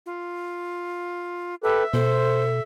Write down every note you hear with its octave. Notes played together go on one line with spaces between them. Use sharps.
F4
G4 A4 B4 E5
B2 A4 C5